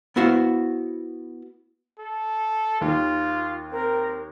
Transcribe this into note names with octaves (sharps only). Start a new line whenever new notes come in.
B3 E4 F#4 C5 F5
A4
D#2 F4
C4 A#4